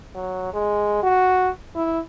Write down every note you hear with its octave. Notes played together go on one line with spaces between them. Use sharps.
F#3
G#3
F#4
E4